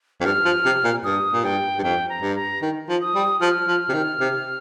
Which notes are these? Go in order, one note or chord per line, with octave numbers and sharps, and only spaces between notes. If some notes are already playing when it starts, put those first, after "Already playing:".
F2
G2 F6
F3
C3
A#2
G2 D#6
A#2
G2 G5
G2
F2 G5
A#5
G2
A#5
D#3
F3
D#6
G3
F3 F6
F3
C3
D#3
C3